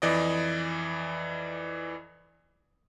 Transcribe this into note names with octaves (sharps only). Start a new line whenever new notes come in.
F2 E3 D5 D#5